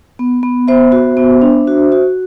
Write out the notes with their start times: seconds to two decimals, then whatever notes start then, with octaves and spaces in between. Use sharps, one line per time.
0.19 B3
0.43 B3
0.68 B3 C5 E5
0.92 F#4
1.17 B3
1.42 D4
1.67 F#4
1.92 F#4